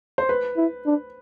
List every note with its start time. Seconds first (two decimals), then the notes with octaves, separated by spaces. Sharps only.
0.18 C5
0.29 B4
0.57 E4
0.86 D4